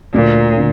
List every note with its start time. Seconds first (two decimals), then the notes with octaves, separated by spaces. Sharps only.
0.13 D2 A#2
0.57 D3